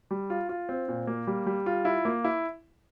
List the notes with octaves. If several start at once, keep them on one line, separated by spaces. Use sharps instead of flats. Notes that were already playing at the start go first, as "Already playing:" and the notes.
G3
F4
F4
C4
A#2
A#3
G3
G3
F4
E4
A#3
E4